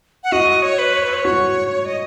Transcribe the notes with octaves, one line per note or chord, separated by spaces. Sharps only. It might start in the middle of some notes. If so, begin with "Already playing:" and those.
F#5
F#4 D#5
C#5
B4
C#5
B4
C#5
F#4
D#5